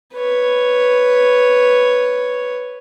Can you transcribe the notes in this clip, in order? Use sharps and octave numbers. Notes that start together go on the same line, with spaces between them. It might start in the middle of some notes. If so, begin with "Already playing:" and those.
B4 C#5